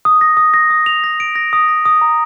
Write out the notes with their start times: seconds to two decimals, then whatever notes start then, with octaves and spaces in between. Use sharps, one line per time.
0.05 D#6
0.21 A#6
0.37 D#6
0.54 A#6
0.70 D#6
0.86 F7
1.04 A#6
1.20 D7
1.36 A#6
1.53 D#6
1.68 A#6
1.85 D#6
2.01 A#5